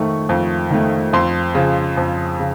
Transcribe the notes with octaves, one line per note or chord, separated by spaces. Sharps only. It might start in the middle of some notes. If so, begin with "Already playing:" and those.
Already playing: F2 D#3 A3 C#6
F2
D#3 A3
F2 C6
C#3 F3
F2
C#3